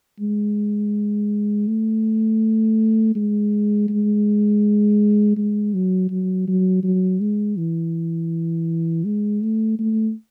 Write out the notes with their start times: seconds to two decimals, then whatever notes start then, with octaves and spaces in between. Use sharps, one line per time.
0.20 G#3
1.67 A3
3.16 G#3
3.89 G#3
5.37 G#3
5.74 F#3
6.10 F#3
6.48 F#3
6.83 F#3
7.21 G#3
7.58 E3
9.05 G#3
9.43 A3
9.79 A3